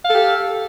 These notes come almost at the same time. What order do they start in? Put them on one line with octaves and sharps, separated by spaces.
F5 A4 G4